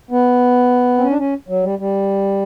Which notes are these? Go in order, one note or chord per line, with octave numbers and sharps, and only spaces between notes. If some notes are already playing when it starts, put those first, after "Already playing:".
B3
C4
C#4
D4
C#4
F#3
G3
G3